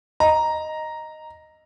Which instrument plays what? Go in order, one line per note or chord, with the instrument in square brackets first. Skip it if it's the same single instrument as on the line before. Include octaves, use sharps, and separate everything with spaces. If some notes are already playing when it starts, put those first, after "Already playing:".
[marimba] D#5 [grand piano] A#5